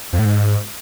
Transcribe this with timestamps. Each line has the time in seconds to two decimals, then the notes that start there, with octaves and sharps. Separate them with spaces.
0.13 F2
0.19 A2
0.25 G#2